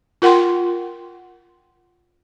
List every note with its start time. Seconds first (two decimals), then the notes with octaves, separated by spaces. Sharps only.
0.22 F4 A#4 F#5 G5 C6